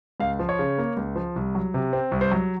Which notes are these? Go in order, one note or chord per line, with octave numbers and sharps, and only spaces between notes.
C#2 F5
F3
C#5
C#3
A#3
C#2
F3
C2
F#3
C3
C4
C2
C5
F#3